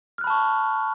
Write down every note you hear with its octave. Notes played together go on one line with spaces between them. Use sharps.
A5 B5 C#6 F6 F#6